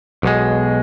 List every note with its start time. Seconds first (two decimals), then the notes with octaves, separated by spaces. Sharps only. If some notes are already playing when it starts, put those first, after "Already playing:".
0.23 B1 B2 G#3